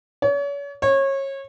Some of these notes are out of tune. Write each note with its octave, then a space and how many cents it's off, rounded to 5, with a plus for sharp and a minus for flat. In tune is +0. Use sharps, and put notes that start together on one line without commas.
C#5 +40
C#5 -25